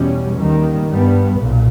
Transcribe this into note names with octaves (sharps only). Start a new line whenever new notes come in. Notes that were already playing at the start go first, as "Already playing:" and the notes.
Already playing: E2 B2 G3 C#4
D#2 D#3 G3
G2 G3 B3
B1 A#2